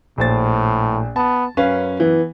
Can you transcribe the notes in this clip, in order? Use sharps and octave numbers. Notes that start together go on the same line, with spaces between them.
A#1 A2 C5 A6
B3 A5
F#2 C#4 B4 F5
E3 B3